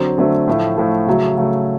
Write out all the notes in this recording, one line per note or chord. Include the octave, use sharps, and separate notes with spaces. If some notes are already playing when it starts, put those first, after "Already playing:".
Already playing: D3 F#3 C4
D3 F#3 A3 C4
A2 F3 A3
A2 F3 A3
C#3 F#3 A3
C#3 F#3 A3